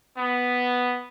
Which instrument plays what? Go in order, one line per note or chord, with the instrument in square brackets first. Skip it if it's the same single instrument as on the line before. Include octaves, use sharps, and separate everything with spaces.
[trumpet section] B3